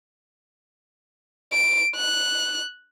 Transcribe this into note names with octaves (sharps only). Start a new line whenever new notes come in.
D7
F#6